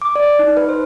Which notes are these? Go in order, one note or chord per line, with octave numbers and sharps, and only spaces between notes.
D6
D5
D#4
B4
C5